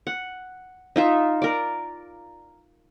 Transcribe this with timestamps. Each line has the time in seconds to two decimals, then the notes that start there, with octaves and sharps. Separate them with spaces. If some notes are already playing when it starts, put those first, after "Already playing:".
0.07 F#5
0.96 D#4 F4 E5
1.42 A#4 D5